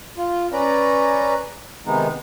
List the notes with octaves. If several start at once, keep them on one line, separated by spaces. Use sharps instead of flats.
F4
C#4 B4 D5 A#5
C3 D#3 G#3 B3 D#4